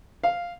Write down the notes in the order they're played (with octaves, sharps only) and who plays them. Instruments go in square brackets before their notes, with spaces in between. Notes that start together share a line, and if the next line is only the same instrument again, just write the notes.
[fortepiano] F5